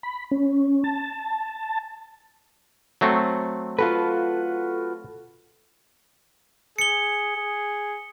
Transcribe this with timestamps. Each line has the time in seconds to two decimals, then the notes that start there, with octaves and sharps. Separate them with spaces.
0.03 B5
0.31 C#4
0.84 A5
3.01 F#3 A3 C4
3.79 F4 F#4 A4 B4
6.79 G#4 C#7 G7
7.36 G#4